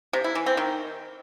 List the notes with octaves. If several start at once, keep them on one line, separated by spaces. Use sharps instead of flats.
C3
E4
E3
C4
D#3